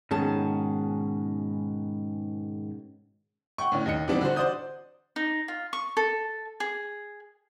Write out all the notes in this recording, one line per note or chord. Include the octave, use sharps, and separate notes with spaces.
G#2 B2 D#3 C#4 G#4 A5
F#5 G5 C#6
A2 D3 C#4
D#2 D#5 C#7
E3 G3 B3 C4 D4 D#4
D3 F#4 C5
C5 D5 F#5 D#6 G6
D#4
F4
C#6
A4
G#4